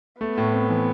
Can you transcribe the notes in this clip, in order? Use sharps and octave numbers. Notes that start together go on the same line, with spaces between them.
A3 B3
A2
C4
E3